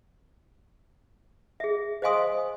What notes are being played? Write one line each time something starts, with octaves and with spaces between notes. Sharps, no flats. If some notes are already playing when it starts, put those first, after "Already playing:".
G#4 E5
C5 D#5 F5 G#5 C6 D#6